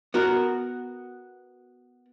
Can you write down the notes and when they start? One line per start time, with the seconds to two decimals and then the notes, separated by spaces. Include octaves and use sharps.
0.14 B3 F#4 A#4